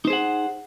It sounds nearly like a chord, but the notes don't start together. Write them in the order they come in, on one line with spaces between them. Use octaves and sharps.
D#4 C5 G#4 F#5